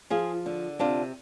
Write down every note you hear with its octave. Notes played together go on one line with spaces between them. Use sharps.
F3 F4 G#4
D3
C3 D4 F4